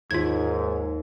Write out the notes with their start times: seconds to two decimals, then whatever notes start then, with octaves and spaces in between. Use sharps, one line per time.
0.11 D#2 G#2 F4 G#6